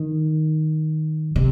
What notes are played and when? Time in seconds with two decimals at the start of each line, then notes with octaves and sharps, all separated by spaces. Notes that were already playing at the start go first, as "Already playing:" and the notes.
Already playing: D#3
1.36 C3